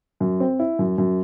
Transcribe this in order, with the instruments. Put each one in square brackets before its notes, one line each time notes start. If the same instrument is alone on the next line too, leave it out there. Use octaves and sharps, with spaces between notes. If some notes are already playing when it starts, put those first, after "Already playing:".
[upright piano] F#2
C4
E4
F#2
F#2